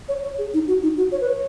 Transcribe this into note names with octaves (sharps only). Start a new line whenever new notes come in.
C#5
C#5
G#4
D#4
F#4
D#4
F#4
C#5
B4
C#5